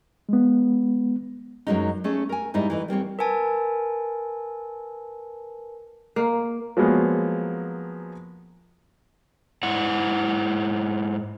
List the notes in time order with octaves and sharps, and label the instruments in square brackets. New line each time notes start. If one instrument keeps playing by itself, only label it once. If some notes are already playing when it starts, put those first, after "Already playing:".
[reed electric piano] G#3 B3
[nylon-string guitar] F#2 A#2 F#3 G#3 C#4 D#4
A3 C#4 G#4
A#4 G#5
G#2 G3 D#4 E4 D#5
E3 A3 D#4
G3 A#3 C4 C#5
[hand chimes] A#4 B4 G#5 A5
[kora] A#3
[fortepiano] F3 F#3 G#3 A#3 B3
[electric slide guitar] G#2 E4 F#5